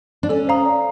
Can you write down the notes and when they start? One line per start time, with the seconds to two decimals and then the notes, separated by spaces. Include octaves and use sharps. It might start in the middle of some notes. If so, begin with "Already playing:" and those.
0.23 D4
0.29 C#4 A4
0.47 C5 F5 A#5 D#6
0.65 D5